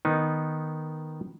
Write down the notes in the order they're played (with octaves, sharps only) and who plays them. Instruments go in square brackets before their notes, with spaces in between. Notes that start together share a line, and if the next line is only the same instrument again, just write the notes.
[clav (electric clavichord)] D#3 B3 D#4